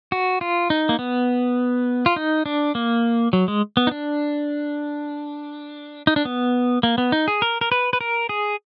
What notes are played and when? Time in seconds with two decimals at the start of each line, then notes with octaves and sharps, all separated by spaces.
0.12 F#4
0.41 F4
0.70 D#4
0.89 A#3
0.99 B3
2.06 F4
2.16 D#4
2.46 D4
2.75 A#3
3.33 F#3
3.48 G#3
3.77 B3
3.87 D#4
3.91 D4
6.07 D#4
6.16 D4
6.25 B3
6.83 A#3
6.98 B3
7.12 D#4
7.28 G#4
7.42 A#4
7.61 A#4
7.72 B4
7.93 B4
8.01 A#4
8.29 G#4